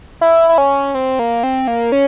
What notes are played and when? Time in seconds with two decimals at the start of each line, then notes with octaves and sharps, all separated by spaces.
0.21 E4
0.49 E4
0.58 C#4
0.94 C4
1.19 A#3
1.43 C4
1.68 A#3
1.92 C#4